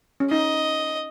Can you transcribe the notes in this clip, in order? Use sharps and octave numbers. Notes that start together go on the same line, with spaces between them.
C#4
D#4 D#5